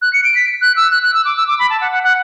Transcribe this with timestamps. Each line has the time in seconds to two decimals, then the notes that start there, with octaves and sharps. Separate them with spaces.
0.02 F#6
0.13 C#7
0.24 D7
0.35 B6
0.61 F#6
0.76 E6
0.91 F#6
1.03 F#6
1.14 E6
1.25 D6
1.37 E6
1.47 D6
1.59 B5
1.70 A5
1.81 F#5
1.92 F#5
2.03 F#5